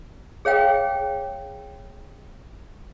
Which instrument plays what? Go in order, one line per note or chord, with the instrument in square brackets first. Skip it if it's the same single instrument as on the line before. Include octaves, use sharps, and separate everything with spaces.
[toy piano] G#4 C#5 F5 G5